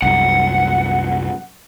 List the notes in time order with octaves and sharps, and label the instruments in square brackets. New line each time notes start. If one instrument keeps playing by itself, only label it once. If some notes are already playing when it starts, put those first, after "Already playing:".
[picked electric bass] C2 F#2 [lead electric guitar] F#5